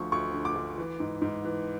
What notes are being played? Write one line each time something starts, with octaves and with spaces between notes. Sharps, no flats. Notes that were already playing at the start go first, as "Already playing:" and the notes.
Already playing: D2 D3 F3 C#6
D2 C#6
D3
D6
D2
E3
G#2
G#2
E3